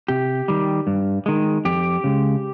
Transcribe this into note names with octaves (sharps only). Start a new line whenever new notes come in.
C3 G4
D#3 G3
G2
D#3 G#3
F2 G4
C#3 G#3